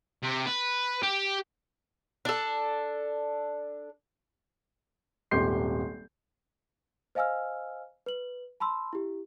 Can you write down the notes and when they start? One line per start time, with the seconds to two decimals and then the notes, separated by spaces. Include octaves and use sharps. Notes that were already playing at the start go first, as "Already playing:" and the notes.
0.23 C3
0.45 B4
1.02 G4
2.25 D4 A4
5.31 D#1 G#1 G4 C6 G6 C7
7.15 C5 D#5 F5 G#5 E6 F6
8.06 B4 F#7
8.60 A5 B5 C6 E6
8.93 E4 G4